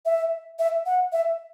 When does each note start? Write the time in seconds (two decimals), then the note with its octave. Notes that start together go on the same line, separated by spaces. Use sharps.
0.05 E5
0.59 E5
0.86 F#5
1.12 E5